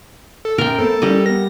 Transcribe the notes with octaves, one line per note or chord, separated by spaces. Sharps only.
A4
F#2 A#2 A#4 G5
A3 B3 C4 A4
G3 C#4 E4 D5 D#5
B3 A#4 A#6